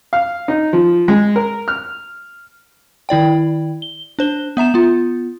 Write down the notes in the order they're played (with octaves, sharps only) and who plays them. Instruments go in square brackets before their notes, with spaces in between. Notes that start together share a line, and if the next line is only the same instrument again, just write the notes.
[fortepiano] F5
D#4
F3
G#3
A#4
F6
[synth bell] D#3 E4 D5 G5
G7
D4 C5 G7
B3 E5 A#5 E7
B3 F4